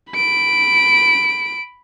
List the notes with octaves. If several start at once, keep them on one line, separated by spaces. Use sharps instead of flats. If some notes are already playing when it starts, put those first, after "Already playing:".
B5 D7